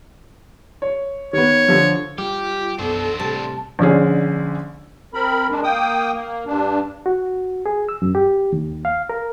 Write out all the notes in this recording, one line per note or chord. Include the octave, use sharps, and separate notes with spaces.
C#5
D#3 B3 C#5
D3 F3
G3 F4 G4
B1 F#2 B3 D4 A4 C5
A2 C3 G3 A5
A#1 D3 C#4 G#4
C4 A#4 B5
D#3 G#3 D4
A#3 G5 D#6
A#3
G2 D4
F#4
G#4
E6
F#2
G4
D#2
F5
A#4